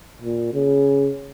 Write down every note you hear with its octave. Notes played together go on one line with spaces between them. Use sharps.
A#2
C#3